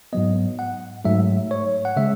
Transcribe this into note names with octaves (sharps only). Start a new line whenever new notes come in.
G#2 F#3 B3 D#5
F#5
G#2 F#3 A3 E5
C#5
F#5
C#3 G#3 E5